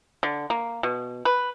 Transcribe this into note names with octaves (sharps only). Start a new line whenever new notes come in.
D3
A#3
B2
B4